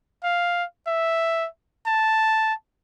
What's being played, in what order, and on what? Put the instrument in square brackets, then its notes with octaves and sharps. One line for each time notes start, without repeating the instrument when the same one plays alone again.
[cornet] F5
E5
A5